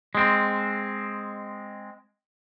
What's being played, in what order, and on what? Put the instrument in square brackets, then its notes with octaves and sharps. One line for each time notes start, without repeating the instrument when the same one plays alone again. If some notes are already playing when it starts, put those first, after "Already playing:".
[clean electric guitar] G#3 C4